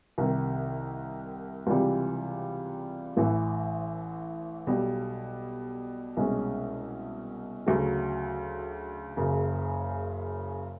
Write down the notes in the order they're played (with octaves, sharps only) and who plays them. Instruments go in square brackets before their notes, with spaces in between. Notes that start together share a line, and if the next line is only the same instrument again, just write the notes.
[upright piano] C2 C3 D#3
C#2 C3 E3 G3
A1 A2 E3 A3
B1 B2 G3
C2 B2 G#3 C#4
D2 C#3 F#3 A3
F#1 F#2 C#3